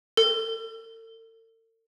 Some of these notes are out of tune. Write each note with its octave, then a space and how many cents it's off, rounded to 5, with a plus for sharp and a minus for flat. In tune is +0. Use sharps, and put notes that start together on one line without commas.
A4 +45